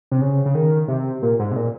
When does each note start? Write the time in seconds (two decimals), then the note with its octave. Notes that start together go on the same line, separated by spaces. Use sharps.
0.12 C3
0.21 C#3
0.45 C#3
0.55 D#3
0.88 C3
1.22 A#2
1.39 G#2
1.52 C3
1.56 A#2